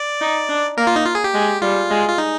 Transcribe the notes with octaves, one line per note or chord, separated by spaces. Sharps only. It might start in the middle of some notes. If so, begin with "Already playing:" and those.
Already playing: D5
D#4
D4
A#3 A#4
F4
D#4
F4
G#4
G4
G#3
G3 F4
G#3
F4
D#4